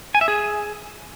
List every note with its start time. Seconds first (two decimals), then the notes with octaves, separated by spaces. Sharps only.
0.15 G#5
0.21 E5
0.28 G#4